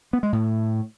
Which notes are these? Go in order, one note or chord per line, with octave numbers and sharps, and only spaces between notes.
B3
G#3
A2